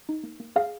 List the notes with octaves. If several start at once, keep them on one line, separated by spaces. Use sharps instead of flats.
D#4
A#3
A#3
G#4 F5